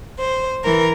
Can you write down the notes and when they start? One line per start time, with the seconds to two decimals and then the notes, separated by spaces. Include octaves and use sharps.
0.18 C5
0.64 E3 A#4